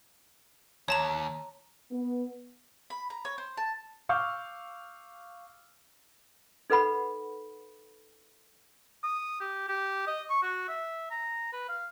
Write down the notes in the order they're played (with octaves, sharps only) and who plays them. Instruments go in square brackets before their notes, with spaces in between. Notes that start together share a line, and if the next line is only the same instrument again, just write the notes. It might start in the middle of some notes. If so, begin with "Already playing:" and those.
[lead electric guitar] D#2 [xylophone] C#5 A5 F7 [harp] A#5 C6
[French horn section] B3
[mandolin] B5
A#5
C#5
C5
A5
[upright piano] F5 C#6 D6 E6 F6 G6
[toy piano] D#4 A4 B4 F#5 B5
[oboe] D#6
G4
G4
D#5
C#6
F#4
E5
A#5
B4
F5